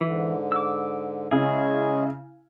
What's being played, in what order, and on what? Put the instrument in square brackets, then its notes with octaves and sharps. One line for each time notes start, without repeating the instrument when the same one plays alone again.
[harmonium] G#2 D3 [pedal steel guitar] E3
[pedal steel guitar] D6 E6
[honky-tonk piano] C#3 E4 [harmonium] G#3 C#4 [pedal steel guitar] G#4